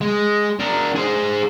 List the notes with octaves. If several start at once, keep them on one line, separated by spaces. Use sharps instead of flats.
G#3
D4 A#4
G#4 C5